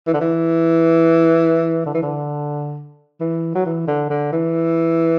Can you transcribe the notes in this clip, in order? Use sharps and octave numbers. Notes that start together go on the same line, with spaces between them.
E3
D3
E3
D3
E3
D3
E3
F#3
E3
D3
D3
E3